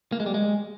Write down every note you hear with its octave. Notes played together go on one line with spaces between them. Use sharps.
A#3
G#3
G3
G#3